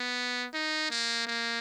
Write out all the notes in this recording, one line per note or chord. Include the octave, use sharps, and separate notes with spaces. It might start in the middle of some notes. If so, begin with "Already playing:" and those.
Already playing: B3
D#4
A#3
A#3